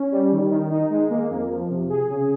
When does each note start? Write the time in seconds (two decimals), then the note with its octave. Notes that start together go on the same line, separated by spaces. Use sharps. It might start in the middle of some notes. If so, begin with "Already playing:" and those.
Already playing: C#4
0.12 G3
0.32 D#3
0.51 D#3
0.70 D#4
0.90 G#3
1.10 A#3
1.30 F2
1.49 F3
1.69 C3
1.89 G#4
2.08 C#3